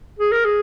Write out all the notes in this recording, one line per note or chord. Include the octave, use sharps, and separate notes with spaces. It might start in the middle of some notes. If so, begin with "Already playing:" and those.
G#4
A#4
G#4